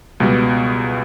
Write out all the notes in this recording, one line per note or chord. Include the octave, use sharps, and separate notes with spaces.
C#2 B2 G3